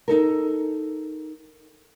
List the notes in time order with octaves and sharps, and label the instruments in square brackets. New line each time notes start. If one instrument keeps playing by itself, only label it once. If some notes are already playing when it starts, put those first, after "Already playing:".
[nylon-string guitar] D#4 A4 A#4